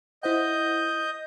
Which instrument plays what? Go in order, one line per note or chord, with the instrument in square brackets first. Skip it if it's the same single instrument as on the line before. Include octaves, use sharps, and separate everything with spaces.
[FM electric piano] E4 C5 F#5 [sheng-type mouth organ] D#5 G6